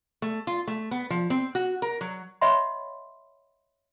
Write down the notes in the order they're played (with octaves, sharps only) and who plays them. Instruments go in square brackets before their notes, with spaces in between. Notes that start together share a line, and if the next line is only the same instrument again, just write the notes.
[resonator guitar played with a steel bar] A3
F4
A3
B3
F3
C4
F#4
A#4
F#3
[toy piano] C#5 D#5 E5 F#5 B5 C6